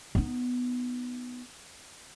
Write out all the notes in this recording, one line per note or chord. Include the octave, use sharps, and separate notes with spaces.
B3 D#4